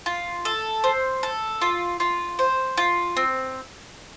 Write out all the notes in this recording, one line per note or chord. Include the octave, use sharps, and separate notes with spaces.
F4
A4
C5
A4
F4
F4
C5
F4
C4